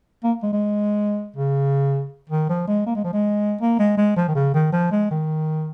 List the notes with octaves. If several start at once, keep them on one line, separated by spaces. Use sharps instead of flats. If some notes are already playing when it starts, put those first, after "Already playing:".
A#3
G#3
G#3
C#3
D#3
F3
G#3
A#3
G#3
F3
G#3
A#3
G#3
G#3
F3
D#3
C#3
D#3
F3
G#3
D#3